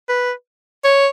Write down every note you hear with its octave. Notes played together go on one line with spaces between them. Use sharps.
B4
C#5